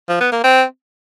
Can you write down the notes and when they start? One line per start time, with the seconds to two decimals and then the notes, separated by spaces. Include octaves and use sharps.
0.08 F3
0.20 B3
0.32 A#3
0.44 C4